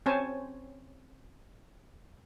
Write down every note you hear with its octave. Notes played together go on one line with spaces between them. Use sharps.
C4 C#4 C5 C#5 G#5 A5